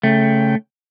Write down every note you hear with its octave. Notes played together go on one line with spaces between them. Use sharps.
C#3 A3 G5